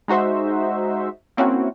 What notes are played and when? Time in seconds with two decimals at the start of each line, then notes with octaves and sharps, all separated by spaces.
0.08 G#3 D#4 F#4 C5 E5
1.37 A#3 C4 C#4 E4 F#4